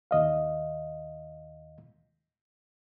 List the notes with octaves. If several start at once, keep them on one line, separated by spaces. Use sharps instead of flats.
D#2 D#5 F5